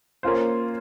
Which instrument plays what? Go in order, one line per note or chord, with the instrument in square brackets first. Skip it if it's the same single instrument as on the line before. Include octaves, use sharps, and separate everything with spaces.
[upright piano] A#3 C#4 F4 C5